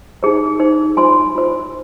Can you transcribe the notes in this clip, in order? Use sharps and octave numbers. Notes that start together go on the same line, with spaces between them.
D#4 G#4 C5
D#4 G#4 C5
F4 C5 G#5 C6
F4 C5